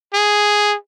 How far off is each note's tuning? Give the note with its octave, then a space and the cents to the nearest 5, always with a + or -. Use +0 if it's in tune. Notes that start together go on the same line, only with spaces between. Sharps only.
G#4 +0